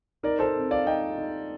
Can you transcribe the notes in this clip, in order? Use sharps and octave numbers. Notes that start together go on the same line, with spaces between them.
D#4 A#4 D5
A4 C5
C4
D5 F5
D#4 D#5 G5
D#4